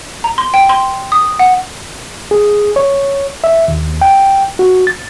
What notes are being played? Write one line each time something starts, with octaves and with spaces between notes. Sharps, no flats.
A#5
C6
G5
C6
D#6
F#5
G#4
C#5
E5
D#2
G5
F#4
A6